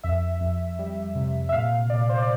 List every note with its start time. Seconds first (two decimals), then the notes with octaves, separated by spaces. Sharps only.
0.04 F2 E5
0.40 F2
0.79 G3
1.15 C3
1.49 E5
1.52 A#2 F5
1.89 A#2 D5
2.09 C5
2.18 D5